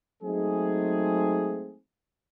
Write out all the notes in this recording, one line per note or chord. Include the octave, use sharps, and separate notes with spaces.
F#3 G#3 A3 C4 D#4 G#4